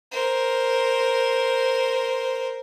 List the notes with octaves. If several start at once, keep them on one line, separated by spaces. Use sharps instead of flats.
A#4 C5